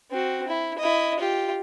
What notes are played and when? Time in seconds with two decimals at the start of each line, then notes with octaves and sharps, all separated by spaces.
0.11 C4 F#4
0.48 E4
0.79 E4 D#5
1.19 F4 G4